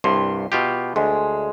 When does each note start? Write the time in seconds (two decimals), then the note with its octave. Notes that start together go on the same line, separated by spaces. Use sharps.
0.04 C2 G2 C6
0.52 B2 F4 G4
0.96 D2 G#3